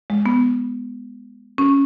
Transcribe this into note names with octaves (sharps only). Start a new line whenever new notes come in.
G#3
B3
C#4